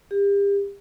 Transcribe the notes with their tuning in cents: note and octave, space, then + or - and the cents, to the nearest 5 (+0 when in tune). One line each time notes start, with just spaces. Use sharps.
G4 +35